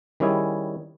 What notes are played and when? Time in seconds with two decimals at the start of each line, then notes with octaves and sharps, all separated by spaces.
0.20 D#3 G3 C#4 E4 G#4 G#5